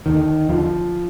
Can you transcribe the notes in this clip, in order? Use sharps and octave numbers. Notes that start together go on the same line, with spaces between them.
D#2 D3 D#3
D#2 D3 F3